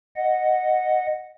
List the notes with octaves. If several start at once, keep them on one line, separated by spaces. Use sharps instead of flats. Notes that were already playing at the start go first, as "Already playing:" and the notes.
D#5 F#5